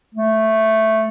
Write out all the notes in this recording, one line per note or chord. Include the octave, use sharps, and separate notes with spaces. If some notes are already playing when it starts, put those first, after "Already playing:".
A3